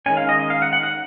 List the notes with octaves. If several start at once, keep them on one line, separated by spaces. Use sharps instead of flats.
D#3 G#3 C#4 G#5
F5
D#5
D#5
F5
F#5
F#5
F#5